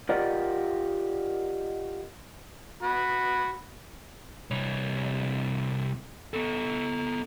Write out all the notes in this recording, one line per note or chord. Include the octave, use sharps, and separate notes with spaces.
F4 G4 A#4 D5 D#5 F#5
F#4 B5
C2 C#5
B3 A4